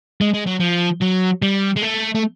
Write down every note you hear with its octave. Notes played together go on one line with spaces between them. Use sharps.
G#3
G#3
F#3
F3
F#3
G3
G#3
A3
A3